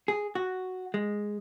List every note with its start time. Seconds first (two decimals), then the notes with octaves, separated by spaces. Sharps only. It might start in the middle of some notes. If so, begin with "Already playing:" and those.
0.08 G#4
0.35 F#4
0.94 G#3